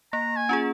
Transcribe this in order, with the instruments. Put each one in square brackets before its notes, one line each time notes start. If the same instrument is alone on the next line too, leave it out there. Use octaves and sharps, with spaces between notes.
[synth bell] A#3 [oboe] A#5
[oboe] G#5
[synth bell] C#4 F4 G#4